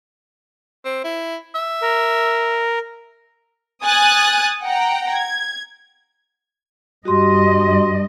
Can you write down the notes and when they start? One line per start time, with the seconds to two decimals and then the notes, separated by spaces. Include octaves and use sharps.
0.85 C4
1.04 E4
1.55 E5
1.82 A#4
3.83 G#5 D#6 F#6 A6
4.63 F#5 G5 A#5
5.11 G#6
7.05 G2 F#4 G4 D#5 C6